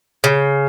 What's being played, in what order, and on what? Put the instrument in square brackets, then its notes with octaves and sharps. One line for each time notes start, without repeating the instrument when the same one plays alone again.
[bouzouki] C#3